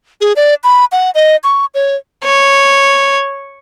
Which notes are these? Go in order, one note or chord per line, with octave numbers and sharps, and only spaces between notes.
G#4
D5
B5
F#5
D#5
C#6
C#5
C#5